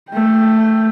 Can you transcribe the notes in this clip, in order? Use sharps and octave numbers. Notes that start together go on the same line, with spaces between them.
A3 G5